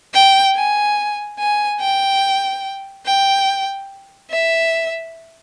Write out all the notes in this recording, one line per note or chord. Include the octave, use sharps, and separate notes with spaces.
G5
G#5
G#5
G5
G5
E5